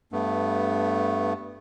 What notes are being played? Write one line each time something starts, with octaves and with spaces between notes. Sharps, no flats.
G2 A3 B3